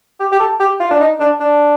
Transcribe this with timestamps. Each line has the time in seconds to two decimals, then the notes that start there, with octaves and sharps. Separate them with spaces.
0.20 G4
0.32 G4
0.40 A4
0.60 G4
0.80 F4
0.91 D4
1.00 D#4
1.20 D4
1.40 D4